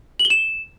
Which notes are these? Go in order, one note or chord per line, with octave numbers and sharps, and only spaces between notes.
F#7
G7
E7